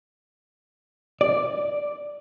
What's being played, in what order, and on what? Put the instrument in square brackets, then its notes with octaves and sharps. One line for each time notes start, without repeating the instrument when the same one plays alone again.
[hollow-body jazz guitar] D5